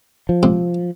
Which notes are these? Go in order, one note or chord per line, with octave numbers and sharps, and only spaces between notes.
F3
C3